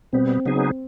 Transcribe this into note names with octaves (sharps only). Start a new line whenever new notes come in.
B2 G3 B3 C4
C#3 F#3 B3 D#4 G#4